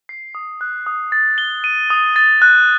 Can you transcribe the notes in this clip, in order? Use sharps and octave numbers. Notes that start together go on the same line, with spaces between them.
C7
D#6
F#6
D#6
A6
G7
D#7
D#6
A6
F#6